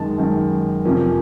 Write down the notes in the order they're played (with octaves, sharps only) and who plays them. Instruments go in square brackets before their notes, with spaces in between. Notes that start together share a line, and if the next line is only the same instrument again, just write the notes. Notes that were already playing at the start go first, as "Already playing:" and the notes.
Already playing: [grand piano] F#2 D#3 G#3 A5
F#2 D#3 G#3
F2 C3 F3 A#3 C#4